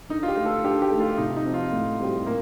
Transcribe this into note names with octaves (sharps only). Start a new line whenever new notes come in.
D3 D#4
F4
G4
A3 D#4
A4
D3 G4
G4
A3 D#4
F4
C3 D#4
D#4
F3 C4
F4
A2
G3 C4 G4
A#2 A#3